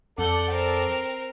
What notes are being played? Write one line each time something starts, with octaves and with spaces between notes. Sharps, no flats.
F2 A4 D5 F#5 G6
C4 A#4